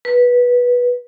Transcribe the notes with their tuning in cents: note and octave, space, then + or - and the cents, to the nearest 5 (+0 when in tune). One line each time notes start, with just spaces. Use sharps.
B4 -15